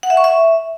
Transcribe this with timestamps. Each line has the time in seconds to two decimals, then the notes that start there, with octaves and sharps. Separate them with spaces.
0.03 F#5
0.10 E5
0.17 C#6
0.24 E5